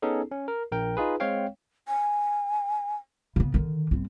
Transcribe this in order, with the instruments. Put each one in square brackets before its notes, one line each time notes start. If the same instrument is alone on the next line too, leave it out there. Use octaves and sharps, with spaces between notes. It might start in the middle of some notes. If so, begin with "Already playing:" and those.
[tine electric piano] B3 C#4 D#4 G#4 A4
C#4
A#4
A#1 A#4 G5
D#4 F4 G#4 B4
G#3 C4 C#5 F5 G5
[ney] G#5
[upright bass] C#3 B3
D3 D#3
G1 C4